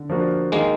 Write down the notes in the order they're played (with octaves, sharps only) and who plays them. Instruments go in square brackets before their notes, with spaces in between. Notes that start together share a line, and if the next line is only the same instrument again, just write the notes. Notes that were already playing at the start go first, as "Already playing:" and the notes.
Already playing: [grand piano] D3
F3 A#3 D4 F#4
[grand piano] D#3 [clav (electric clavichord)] G#3 A#3